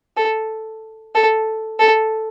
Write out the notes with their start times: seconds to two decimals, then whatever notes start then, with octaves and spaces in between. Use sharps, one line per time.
0.17 A4
1.15 A4
1.80 A4